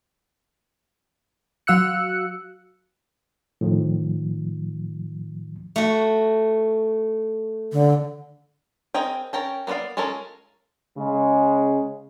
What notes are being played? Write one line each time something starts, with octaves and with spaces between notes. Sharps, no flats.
F#3 F#4 F5 E6 F#6 C#7
A2 D#3 F3
A3 F#4
D3
C4 G#4 A#4 D#5 G5
C#4 A#4 G5 A5
A#3 B3 F#4 D5 F5
G#3 C#4 F4 A4 A#4
C#3 G#3